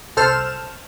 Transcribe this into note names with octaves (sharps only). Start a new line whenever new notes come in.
C2 A4 C5 F6 E7